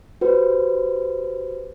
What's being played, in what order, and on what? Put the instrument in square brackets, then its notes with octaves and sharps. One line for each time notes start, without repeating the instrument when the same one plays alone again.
[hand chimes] F#4 G4 B4 C5